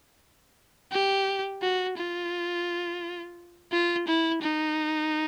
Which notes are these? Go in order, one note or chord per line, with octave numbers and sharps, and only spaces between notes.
G4
F#4
F4
F4
E4
D#4